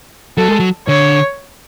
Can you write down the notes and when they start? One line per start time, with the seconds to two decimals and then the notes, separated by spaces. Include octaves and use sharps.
0.37 F#3 A4
0.48 G#3
0.60 F#3
0.88 D3 C#5